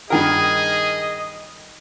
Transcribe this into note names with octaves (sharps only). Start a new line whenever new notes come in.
G2 D#3 G#4 A#4 D#5